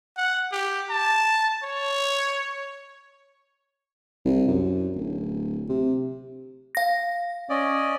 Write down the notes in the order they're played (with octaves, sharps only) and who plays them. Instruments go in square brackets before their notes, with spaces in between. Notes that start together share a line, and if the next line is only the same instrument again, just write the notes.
[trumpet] F#5
G4
A5
C#5
[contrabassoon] C2
F#2
D1
C3
[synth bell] F5 A#6
[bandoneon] C#4 D5 D#5